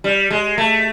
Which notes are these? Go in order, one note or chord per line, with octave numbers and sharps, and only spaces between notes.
G3
G#3
A3